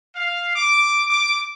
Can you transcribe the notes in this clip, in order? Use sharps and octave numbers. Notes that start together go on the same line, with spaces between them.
F5
D6
D6